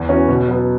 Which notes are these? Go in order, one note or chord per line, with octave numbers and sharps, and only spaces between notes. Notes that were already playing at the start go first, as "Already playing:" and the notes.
Already playing: E2
E3 C#4 F#4
B2
F#3 B3